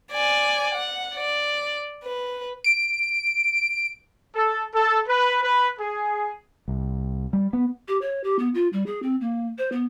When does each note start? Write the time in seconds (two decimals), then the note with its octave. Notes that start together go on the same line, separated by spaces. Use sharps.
0.12 D5 G#5
0.75 F#5
1.15 D5
2.04 B4
2.64 D7
4.35 A4
4.75 A4
5.08 B4
5.43 B4
5.79 G#4
6.68 C2
7.33 G3
7.53 B3
7.88 G4
8.01 C#5
8.24 G4
8.39 B3
8.54 F4
8.73 G3
8.86 G#4
9.03 C4
9.21 A#3
9.58 C5
9.72 B3